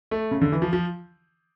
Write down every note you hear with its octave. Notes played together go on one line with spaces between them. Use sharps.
A3
C#3
D3
E3
F3
F3